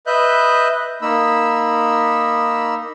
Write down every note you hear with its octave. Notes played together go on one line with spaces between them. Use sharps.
B4 D#5 E5 F#6 G6
A#3 D#4 B5 E6